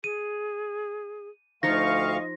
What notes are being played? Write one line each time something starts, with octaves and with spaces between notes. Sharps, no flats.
G#4 D#7
D2 F3 D#4 F4 D#5 F5 C#6 A#6